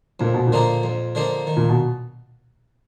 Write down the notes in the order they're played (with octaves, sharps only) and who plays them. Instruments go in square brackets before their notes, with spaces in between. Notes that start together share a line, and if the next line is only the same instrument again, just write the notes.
[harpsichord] F2 [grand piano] A#2
[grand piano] B2
A#2
[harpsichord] D3 F3 A#3 D#4
F2
D3 F3 A#3 D#4
D#3
[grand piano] A#2
B2